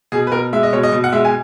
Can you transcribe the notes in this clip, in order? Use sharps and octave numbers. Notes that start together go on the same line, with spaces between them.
B2 G#4
B4
B2 A#4
G#3 E5
D#5
B2 C#5
D#5
B2
F#5
G#3 E5
G#5